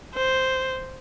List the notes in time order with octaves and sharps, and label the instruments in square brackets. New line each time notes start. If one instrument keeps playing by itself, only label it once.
[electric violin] C5